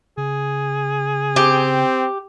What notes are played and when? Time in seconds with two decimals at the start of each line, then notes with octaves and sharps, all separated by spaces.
0.17 C#3 G#4
1.36 C4 G4